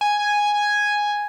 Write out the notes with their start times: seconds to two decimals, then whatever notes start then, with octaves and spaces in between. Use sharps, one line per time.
0.01 G#5